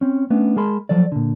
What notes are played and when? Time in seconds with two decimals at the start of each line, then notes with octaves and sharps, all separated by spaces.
0.01 C4 C#4
0.30 A3 B3 C#4 D4
0.56 G#3 G#4 A#4 A5 B5 C6
0.89 F3 F#3 A4 D5
1.12 A#2 D3